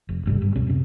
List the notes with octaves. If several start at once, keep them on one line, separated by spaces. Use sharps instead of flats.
F1
A1 G2 C3 G3
G2
C#2 B2 C#4
F#2 C3